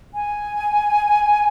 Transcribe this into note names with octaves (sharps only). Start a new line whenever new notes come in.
G#5